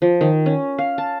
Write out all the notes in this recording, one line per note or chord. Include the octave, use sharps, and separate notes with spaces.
F3
D#3
C#4
F5
A5